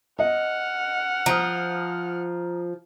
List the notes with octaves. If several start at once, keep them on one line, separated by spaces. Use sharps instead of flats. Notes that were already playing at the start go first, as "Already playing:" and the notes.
D#5 F#5 F6
F3 A#5 D#6